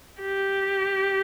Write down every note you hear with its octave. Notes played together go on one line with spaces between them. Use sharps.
G4